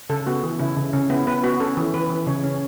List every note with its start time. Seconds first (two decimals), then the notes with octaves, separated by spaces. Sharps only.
0.09 C#3 A4
0.26 B3 F#4
0.43 E3
0.59 C#3 E4
0.77 C#3
0.93 C#3 C#4
1.10 B3 E4
1.27 B3 B4
1.44 B3 F#4
1.60 C#4 A4
1.77 E3
1.94 E3 B4
2.10 E3
2.27 C#3 C#5
2.44 C#4